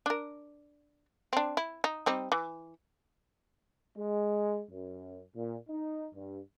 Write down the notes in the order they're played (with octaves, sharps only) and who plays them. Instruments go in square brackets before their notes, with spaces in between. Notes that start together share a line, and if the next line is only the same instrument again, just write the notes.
[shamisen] D4 A#4
C4 D4
E4
D#4
G3 C4 D#4
E3
[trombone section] G#3
F#2
A#2
D#4
G2